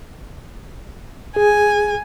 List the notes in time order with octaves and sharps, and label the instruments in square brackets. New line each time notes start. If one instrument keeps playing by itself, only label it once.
[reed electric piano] G#4 [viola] G#5